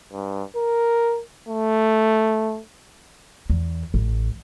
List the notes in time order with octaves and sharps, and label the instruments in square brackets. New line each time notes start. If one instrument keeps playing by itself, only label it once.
[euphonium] G2
A#4
A3
[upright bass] E2
A1